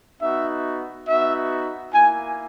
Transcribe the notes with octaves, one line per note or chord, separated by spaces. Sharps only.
B3 D#4 F#4 E5
B3 D#4 F#4 E5
A#3 E4 G#5